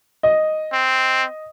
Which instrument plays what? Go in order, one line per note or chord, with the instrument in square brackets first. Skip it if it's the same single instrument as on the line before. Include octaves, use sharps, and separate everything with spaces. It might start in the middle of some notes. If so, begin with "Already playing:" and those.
[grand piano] D#5
[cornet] C4